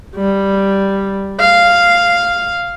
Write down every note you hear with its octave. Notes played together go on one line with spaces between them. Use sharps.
G3
F5